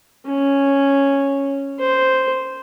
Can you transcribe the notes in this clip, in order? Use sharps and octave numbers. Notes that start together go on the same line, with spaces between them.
C#4
C5